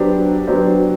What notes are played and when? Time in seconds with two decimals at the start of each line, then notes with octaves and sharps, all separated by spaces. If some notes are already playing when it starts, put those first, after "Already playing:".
Already playing: F#3 B3 D4 G4 C5
0.47 F#3 B3 D4 G4 C5